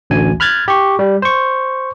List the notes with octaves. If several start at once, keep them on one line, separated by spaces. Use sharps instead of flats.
A1 D2 G#5
B5 F6 F#6 G#6 A6
G4 C#6
G3
C5 C#6